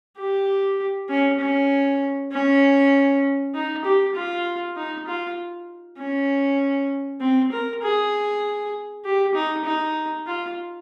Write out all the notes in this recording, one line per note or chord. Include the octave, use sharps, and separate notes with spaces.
G4
C#4
C#4
C#4
D#4
G4
F4
D#4
F4
C#4
C4
A#4
G#4
G4
D#4
D#4
F4